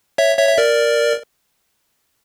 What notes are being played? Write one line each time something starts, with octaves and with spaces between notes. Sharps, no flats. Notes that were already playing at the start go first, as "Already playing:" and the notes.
C#5 E5
C#5 E5
E5
A#4 D5